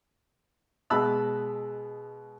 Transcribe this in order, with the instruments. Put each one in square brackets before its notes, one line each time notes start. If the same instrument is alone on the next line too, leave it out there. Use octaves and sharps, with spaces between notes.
[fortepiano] B2 G#3 A5 B5 E6 F#6